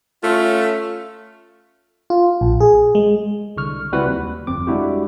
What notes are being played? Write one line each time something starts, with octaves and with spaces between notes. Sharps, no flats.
A3 C#4 F4
F4
A#1
G#4
G#3
C2 D3 C#6 F6
C#2 G3 C4 E4 F#4 B4
D#2
G1 F2 C4 D6
G3 G#3 D4 E4 F#4 G4